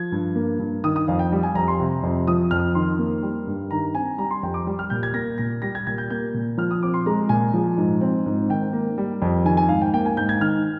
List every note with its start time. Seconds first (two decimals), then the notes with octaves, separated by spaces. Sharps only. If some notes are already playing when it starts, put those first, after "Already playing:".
Already playing: F3 G#6
0.12 G2
0.35 A#3
0.59 G2
0.84 D#3 D#6
0.96 D#6
1.08 F2 F5
1.19 G5
1.32 G3
1.43 G#5
1.55 F2 A#5
1.68 C6
1.80 C3
2.03 F2
2.27 F3 D#6
2.51 F2 F6
2.75 D#3 C6
2.99 A#3
3.23 G3
3.47 G2
3.71 D#3 A#5
3.94 C4 G#5
4.18 G3 A#5
4.31 C6
4.43 F2 G5
4.54 D6
4.67 G3
4.79 F6
4.90 A#2 G6
5.03 G#6
5.14 A#3 A#6
5.38 A#2 A#6
5.62 G3 A#6
5.75 G#6
5.87 A#2 G#6
5.98 G6
6.10 A#3 G6
6.34 A#2
6.58 F3 F6
6.71 D#6
6.83 C4 D6
6.94 C6
7.06 G#3 A#5
7.29 A#2 G#5
7.54 F3
7.77 G#2
8.01 C4
8.26 G#2
8.49 D#3 G5
8.73 A#3
8.98 G3
9.22 F2
9.45 D#3 G#5
9.57 G#5
9.69 G#2 F5
9.81 G5
9.94 A#3 G5
10.06 G#5
10.17 G#2 G6
10.29 G#6
10.40 D#3 F6